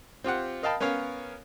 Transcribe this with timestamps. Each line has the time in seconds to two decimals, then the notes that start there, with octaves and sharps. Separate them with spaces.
0.24 C4 F4 G4 F#5
0.63 A#4 D#5 F5 G5 A5 B5
0.81 B3 C#4 A#4 C#5 F5